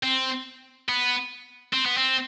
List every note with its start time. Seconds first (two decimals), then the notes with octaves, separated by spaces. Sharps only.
0.03 C4
0.89 B3
1.73 C4
1.86 B3
1.97 C4